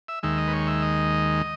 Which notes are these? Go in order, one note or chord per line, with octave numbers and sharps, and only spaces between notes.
E5
D#2 D#3 G#3 E5
D#5
B4
C#5
E5
D#5